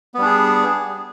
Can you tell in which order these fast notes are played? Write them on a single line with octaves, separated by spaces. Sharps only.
B3 G3 D4 G#4